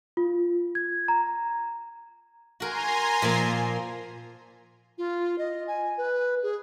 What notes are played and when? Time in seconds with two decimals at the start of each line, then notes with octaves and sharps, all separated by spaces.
0.17 F4
0.75 G#6
1.08 A#5
2.60 F#4 A#4 G#5 A#5 C6
3.22 A#2 F3 A#3
4.98 F4
5.38 D#5
5.67 G#5
5.98 B4
6.43 G#4